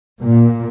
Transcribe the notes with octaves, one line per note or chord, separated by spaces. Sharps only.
A#2